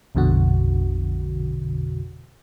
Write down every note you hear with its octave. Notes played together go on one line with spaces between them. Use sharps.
A#1 F2 B2 D3 F#4